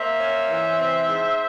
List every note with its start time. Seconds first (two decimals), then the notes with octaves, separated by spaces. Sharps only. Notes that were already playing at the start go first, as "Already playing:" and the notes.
Already playing: A#3 C5 E5
0.17 C#4
0.47 E3
0.77 C4
1.07 G#2